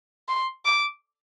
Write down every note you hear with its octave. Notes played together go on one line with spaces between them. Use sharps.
C6
D6